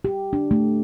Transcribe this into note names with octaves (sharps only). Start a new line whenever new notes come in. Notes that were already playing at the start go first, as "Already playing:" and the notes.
G4
D4
A3